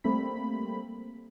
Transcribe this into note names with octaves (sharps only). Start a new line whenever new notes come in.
G3 A3 A#3 C4 B5